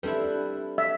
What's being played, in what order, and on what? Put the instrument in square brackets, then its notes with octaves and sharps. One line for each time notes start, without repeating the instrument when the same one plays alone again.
[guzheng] G3 C4 E4 [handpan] D4 A4 B4
[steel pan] E5